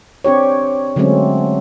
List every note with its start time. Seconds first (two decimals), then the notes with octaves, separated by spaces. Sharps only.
0.25 C4 D4 G4 C#5
0.96 D3 F#3 G#3 A3 C4 C#4